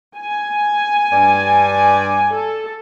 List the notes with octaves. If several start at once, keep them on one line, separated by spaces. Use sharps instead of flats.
G#5
G2 D5
A4